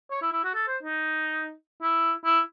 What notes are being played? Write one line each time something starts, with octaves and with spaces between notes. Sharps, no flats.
C#5
E4
E4
F#4
A4
C5
D#4
E4
E4